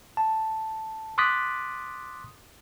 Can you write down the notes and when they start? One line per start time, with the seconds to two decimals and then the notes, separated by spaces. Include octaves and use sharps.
0.17 A5
1.18 C6 D6 D#6 F#6 A6 B6